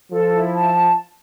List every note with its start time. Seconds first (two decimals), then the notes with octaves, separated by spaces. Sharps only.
0.11 F3 A4
0.32 E4
0.53 A5